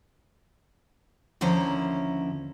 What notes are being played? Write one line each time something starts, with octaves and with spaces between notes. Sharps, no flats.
D#2 D3 F3 C#4 E4 A#4